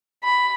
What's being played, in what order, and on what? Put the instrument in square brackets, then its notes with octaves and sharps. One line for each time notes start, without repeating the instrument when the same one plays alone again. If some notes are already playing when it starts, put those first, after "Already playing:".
[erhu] B5